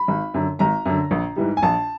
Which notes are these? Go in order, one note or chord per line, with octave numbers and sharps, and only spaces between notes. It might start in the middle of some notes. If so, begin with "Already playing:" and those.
Already playing: B5
G#1
F#2 D3
G#1 A#5
F#2 D3
A#1
G#2 E3 G3
G#5
A#1 A5